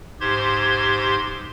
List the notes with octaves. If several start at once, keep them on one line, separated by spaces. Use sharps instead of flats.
G#2 G4 C5 C6 G#6